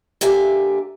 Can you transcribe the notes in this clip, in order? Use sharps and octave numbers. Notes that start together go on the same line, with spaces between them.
D3 A#3 G4 E5 G#5